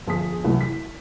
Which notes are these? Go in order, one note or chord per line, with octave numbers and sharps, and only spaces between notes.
G1 F3 G#4 D#6 B6
C2 E3 F#3
B6